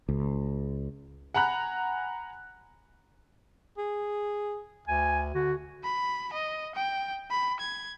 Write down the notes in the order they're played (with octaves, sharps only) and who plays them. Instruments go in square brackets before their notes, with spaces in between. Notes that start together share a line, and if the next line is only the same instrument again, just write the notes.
[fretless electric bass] C#2
[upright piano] F#5 G#5 A#5 B5 F#6
[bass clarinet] G#4
[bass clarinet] D2 [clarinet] G#5
[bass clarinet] D3 [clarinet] F#4
[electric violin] B5
D#5
G5
B5
G#6